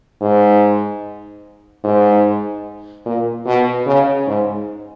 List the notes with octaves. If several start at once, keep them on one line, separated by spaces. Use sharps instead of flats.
G#2
G#2
A#2
B2
C#3
G#2